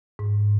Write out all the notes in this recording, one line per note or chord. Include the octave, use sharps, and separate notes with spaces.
G#2